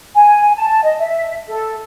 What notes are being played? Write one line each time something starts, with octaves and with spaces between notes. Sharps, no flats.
G#5
A5
D#5
E5
A4